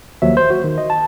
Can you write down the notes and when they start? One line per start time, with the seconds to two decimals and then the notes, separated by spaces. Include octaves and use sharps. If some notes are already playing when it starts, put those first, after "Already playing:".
0.22 D#2 F3 F#3 E5
0.37 C5
0.50 F#4
0.64 D#3
0.78 D#5
0.90 A5